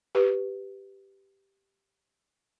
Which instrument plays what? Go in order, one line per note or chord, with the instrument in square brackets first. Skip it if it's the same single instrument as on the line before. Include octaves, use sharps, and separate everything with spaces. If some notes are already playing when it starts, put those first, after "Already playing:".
[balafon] G4 B4